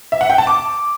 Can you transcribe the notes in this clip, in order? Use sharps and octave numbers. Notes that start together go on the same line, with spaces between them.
E5
F#5
G5
A5
D6